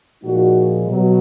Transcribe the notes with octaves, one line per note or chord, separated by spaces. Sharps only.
A#2 F3 G#3 D#4 F#4
B2 F#3